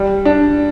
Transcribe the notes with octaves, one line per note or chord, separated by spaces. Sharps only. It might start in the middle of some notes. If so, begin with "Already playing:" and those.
Already playing: G3
D4